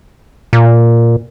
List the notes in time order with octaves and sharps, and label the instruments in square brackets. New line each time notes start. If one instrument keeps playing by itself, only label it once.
[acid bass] A#2